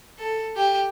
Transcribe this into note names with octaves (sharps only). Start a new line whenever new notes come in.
A4
G4